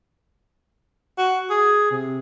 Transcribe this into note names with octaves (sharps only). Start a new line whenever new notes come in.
F#4
G#4
C3